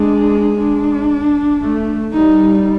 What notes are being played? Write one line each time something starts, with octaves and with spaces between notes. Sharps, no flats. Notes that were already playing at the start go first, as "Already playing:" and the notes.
Already playing: G#3 D4
D4
A3
G3 D#4